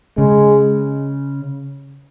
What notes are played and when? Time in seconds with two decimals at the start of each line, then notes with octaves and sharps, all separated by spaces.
0.18 C#3 G#3